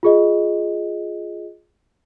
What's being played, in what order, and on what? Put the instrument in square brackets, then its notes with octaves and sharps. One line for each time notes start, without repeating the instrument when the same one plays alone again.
[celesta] F4 G#4 D#5